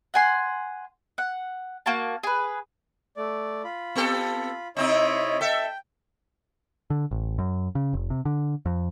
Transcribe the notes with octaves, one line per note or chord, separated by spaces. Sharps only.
F#5 G#5 C6
F#5
A#3 F#4 A5
G#4 B4
A3 D5
F4 B5
B3 G4 A4
C3 C4 D#4 E4 C#5 D#5
A4 E5 G5
D3
A1
F#2
C#3
F1
C3
D3
F2